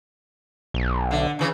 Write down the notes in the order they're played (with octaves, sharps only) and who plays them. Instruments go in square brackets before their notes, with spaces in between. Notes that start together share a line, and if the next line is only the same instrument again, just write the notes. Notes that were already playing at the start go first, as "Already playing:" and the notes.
[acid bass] B1
[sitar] D3
C#3 E3